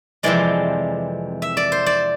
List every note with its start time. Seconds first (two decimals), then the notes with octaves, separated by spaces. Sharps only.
0.23 F2 C3 E3 G#3 D5
1.42 E5
1.57 D5
1.72 C5
1.86 D5